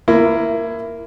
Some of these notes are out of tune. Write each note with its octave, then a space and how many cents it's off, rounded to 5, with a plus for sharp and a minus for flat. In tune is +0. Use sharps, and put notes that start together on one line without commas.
A#3 -5 E4 +15